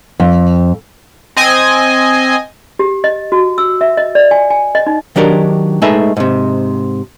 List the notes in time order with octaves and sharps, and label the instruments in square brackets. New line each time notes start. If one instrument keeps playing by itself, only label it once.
[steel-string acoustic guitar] F2
[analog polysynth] C4 D#5 G#5
[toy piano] G4
D#5
F#4
E6
E5
D#5
D5
G#5
G#5
D#5
D#4
[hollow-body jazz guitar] D#3 F#3 D4 G4 A#4
G#3 A3 D#4 G#4 B4 E5
G#2 C3